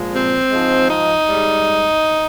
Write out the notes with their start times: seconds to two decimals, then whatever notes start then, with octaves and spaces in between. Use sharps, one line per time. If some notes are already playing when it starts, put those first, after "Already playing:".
Already playing: A#2 F3 G#3
0.14 C4
0.51 G#2 F3 G#3
0.89 D#4
1.27 G#2 G3